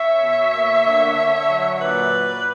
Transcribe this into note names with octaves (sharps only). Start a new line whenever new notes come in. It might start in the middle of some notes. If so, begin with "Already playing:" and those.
Already playing: C#4 C#5 E5
B2
A#3
D3
D3
F#3
C#5
A#2 B4 D5
A#2